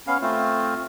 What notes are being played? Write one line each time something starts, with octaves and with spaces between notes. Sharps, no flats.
B3 C#4 F5
A3 C4 F4